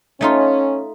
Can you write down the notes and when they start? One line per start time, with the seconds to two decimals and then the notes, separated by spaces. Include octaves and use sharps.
0.21 A3 C#4 D#4 F4